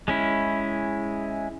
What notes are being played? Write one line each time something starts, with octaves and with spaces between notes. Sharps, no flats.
G#3 C#4 E4